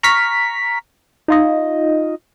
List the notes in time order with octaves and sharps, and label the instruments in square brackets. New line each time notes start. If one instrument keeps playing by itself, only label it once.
[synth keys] A#5 C#6 F6 B6
D#4 F4 D#5